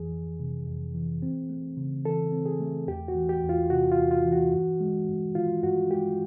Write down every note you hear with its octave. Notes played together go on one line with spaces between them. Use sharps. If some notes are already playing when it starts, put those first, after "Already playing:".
Already playing: F2 E3 G#4
F2
C3
F2
E3
C4
A3
C#3
E3 A4
C4
G#4
A3
E2 G4
F#4
E3
G4
E2
F4
C3 F#4
F4
E2
F4
E3
F#4
G2
G#3
G2
D#3 F4
G2 F#4
G#3 G4